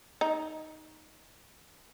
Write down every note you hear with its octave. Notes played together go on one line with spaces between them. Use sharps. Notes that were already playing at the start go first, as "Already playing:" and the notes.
D#4